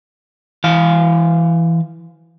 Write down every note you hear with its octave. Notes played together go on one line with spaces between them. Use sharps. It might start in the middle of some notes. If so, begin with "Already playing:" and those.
E3 F5